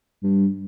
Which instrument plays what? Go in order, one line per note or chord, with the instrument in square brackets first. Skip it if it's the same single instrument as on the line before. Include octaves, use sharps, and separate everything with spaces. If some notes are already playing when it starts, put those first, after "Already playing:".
[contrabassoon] G2